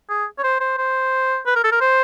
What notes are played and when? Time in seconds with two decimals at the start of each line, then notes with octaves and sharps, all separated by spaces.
0.09 G#4
0.38 C#5
0.43 C5
0.60 C5
0.77 C5
1.46 B4
1.55 A#4
1.64 A4
1.71 A#4
1.81 C5